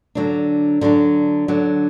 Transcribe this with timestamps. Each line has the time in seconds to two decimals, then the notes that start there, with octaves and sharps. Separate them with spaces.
0.15 D3 F#3 D4
0.81 D3 F#3 D4
1.48 D3 F#3 D4